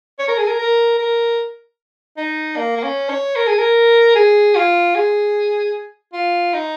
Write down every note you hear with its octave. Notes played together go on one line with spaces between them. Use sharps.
C#5
A#4
G#4
A#4
A#4
A#4
D#4
A#3
A#3
C#4
C#5
A#4
G#4
A#4
G#4
F4
G#4
F4
D#4